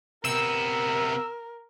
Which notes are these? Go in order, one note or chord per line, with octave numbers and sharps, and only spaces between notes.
C3 B3 A#4 E6